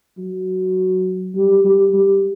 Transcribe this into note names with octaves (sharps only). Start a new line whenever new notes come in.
F#3
G3
G3
G3